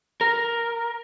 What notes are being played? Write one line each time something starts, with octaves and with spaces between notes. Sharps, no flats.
A#4